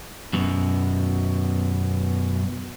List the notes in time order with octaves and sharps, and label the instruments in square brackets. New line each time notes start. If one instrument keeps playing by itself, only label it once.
[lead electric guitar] F#2 B2